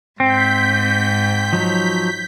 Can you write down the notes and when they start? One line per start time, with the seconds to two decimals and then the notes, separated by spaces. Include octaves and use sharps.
0.20 G#2 C4 G6 B6
1.53 F3 F#3 D#4